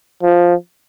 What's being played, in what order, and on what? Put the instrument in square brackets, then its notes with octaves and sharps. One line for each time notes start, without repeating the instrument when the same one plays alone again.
[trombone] F3